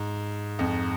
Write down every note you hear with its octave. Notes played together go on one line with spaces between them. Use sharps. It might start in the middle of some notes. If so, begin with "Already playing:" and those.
Already playing: G#2
F2